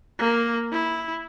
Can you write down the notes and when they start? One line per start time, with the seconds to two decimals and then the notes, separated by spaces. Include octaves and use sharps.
0.19 A#3
0.72 E4